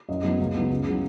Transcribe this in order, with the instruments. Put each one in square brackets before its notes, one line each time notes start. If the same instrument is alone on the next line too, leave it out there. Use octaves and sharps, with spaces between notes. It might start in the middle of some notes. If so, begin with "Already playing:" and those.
[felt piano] F#2 D#5
F#3 B3
C#2
C#3 F#3 B3
C#2
C#3 F#3